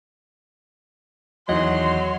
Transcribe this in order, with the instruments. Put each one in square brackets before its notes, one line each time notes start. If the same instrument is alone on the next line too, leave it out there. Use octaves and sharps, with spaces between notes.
[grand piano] E2 D#3 [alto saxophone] F#3 [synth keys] D#5 [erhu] C6